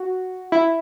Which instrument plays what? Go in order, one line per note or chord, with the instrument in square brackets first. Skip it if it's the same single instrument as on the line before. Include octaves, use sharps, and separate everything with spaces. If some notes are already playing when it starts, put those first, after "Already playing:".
Already playing: [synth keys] F#4
E4